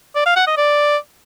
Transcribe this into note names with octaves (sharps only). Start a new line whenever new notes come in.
D5
F5
F#5
D#5
D5